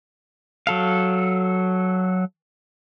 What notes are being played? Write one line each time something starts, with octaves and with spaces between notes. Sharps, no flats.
F#3 A4 F5